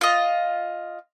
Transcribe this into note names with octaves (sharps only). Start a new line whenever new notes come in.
F4 D#5